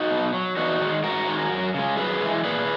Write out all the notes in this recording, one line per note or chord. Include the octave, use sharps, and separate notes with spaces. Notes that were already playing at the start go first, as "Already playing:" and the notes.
Already playing: D#4 F#4
B2
F#3
E2 D#4 F#4
D#3 G#3
G#2 F#4 A#4
D#3 G#3
F#2
C#3 G#3
F#2 G#4 B4
E3 G#3
A#2 G#4 B4